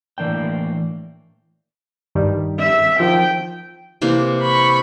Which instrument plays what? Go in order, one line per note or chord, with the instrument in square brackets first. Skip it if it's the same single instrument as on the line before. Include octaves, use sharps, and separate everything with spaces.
[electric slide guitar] A2 E3 A#3 D4 G5
[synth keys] G2 D#3 G3
[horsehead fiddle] E5
[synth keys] D#3 F3 [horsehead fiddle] G5
[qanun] C3 E3 A#3
[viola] B5 C#6